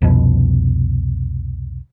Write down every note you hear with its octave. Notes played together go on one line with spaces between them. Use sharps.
C2 F2 B2